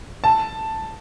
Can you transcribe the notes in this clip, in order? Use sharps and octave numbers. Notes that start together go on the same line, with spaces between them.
A5